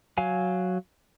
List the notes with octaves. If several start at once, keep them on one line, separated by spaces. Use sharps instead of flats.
F#3 F5 G#5